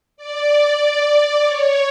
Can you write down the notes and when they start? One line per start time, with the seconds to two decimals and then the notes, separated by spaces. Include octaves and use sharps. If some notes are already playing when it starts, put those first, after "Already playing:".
0.17 D5
0.80 D5
1.44 C#5